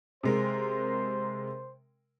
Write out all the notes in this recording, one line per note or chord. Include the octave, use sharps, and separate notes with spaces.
C3 G#3 A#4 C5